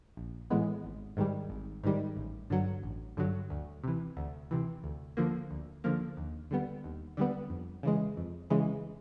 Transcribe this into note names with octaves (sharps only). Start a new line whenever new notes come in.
A#1
A2 E3 G#3 B3
G#1
G#2 D#3 G3
G#1
G#2 D#3 G3
A1
G2 D3 F#3
A1
G2 D3 F#3
D2
C3 E3
D2
C3 E3
D2
D3 F3 A#3
D2
D3 F3 A#3
D#2
D3 G3 B3
D#2
D3 G3 B3
F2
C#3 E3 G#3
F2
C#3 E3 G#3